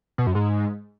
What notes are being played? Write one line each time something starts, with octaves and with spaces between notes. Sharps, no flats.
B2
F#2
G#2